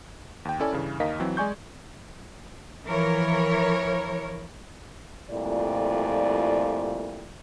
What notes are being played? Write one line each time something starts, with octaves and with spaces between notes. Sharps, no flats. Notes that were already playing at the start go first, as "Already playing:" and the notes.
D#2 G5
C#4 E4 A4 D5 G#5
G2 C#3 E3
D#2 D#4 A#4 D#5 F5 B6
E3 F#3 C4
G#3 D5 G#5 C#6 G6
E3 F3 A#4 C#5
F2 A#2 G3 A3 E4 D5